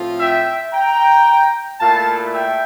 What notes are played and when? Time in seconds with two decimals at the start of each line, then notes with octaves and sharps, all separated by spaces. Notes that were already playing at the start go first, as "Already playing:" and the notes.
Already playing: A2 F3 C4 F4
0.19 E5 G5
0.73 G5 A#5
1.80 A#2 A3 E4 F5 A5
2.33 E5 G5